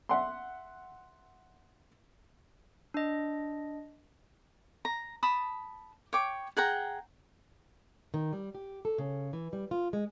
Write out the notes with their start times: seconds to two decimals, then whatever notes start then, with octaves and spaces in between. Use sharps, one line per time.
0.09 E5 F#5 C6
2.94 D4 D#5
4.85 A#5
5.23 A5 B5 D#6
6.13 C#5 G5 D6
6.57 G#4 F#5 G5 A#5
8.14 D#3
8.33 G3
8.55 G4
8.85 A4
8.98 C#3
9.33 E3
9.53 G3
9.71 F4
9.93 G#3